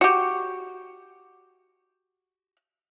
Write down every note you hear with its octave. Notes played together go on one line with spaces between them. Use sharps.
F#4 G4